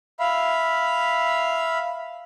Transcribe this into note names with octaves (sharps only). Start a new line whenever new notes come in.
E5 F5 B5